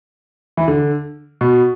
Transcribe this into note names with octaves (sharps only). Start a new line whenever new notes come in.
E3
D3
B2